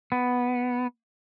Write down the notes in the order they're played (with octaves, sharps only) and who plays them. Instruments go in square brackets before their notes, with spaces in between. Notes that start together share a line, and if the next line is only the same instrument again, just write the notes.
[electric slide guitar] B3